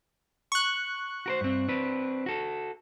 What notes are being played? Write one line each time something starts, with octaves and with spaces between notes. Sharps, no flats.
C#6 F#6
F#4 A#4 C5
G2 C4
C4 D4 B4
F#4 A4